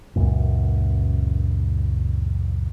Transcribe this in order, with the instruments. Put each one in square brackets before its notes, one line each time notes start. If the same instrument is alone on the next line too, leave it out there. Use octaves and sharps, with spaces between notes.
[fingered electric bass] C#2 F#2 A#2